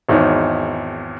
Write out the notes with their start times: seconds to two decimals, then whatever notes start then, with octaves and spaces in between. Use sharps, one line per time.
0.09 G#1 E2 D#4 C#5